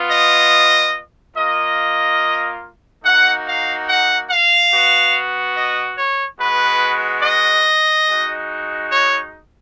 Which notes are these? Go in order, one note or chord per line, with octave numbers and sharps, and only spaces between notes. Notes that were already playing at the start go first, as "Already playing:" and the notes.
Already playing: B3 F4
D#5
A#3 F4 D#5
A#3 D#4 F#4 F#5
F5
F#5
F5
B3 F#4
D#5
C#5
G#3 B3 F#4 B4
D#5
G#3 D#4 F#4
C#5